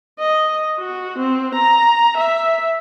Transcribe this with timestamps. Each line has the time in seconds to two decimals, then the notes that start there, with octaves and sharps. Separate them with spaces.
0.19 D#5
0.79 F#4
1.18 C4
1.54 A#5
2.17 E5